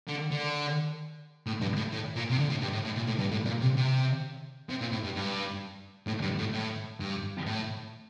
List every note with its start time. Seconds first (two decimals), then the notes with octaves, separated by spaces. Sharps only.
0.08 D3
0.31 D3
1.47 A2
1.61 G2
1.76 A2
1.92 A2
2.16 A#2
2.30 C3
2.39 D3
2.50 A2
2.62 G2
2.73 A2
2.85 A2
2.96 A#2
3.07 A2
3.19 G2
3.31 A2
3.45 A#2
3.61 C3
3.77 C3
4.69 C3
4.81 A#2
4.92 A2
5.04 G2
5.16 G2
6.07 A2
6.22 G2
6.39 A2
6.53 A2
7.00 G2
7.46 A2